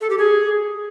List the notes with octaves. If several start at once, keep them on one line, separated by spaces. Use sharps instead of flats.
A4
G4
G#4